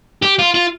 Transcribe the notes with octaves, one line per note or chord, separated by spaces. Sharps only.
G4
F4
F4